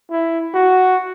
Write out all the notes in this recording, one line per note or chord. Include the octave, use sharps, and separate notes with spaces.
E4
F#4